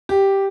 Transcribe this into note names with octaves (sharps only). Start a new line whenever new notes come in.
G4